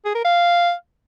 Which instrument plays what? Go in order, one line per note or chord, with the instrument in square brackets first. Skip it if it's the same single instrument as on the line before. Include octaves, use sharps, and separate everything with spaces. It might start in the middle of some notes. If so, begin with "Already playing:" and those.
[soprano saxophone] G#4
A#4
F5